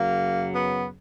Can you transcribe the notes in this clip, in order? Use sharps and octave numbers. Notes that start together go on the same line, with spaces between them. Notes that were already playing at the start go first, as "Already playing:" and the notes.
Already playing: F#2 C#3 F#3 A#3
B3